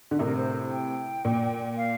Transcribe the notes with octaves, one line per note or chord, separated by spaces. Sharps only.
D3
A2 C3 A#4
C5
G5
A#2
F5